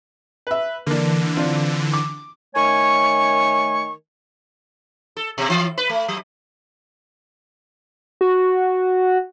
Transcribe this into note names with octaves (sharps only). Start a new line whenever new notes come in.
B4 E5
D3 E3 A#3 D4
C4 D4 F4
D6
D#3 A3 C#5 G#5 C#6
A4
B2
E3
B4
A3
F#3
F#4